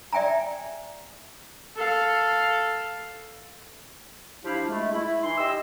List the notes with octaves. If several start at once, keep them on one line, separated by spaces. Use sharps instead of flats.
D5 E5 G5 G#5 A#5
A4 F5
F3 D4 E4 G4 F5
G#3 A3
E4
E3 D#4 C6
G4 D#5 E6